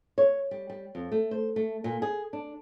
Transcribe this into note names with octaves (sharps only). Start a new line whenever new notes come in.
C#5
G3
G3
F2
A3
C5
A3
A#2
G#4
D4